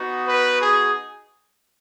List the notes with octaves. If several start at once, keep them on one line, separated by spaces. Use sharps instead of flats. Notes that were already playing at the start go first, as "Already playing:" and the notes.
Already playing: B3 D#4 F#4
B4
G#4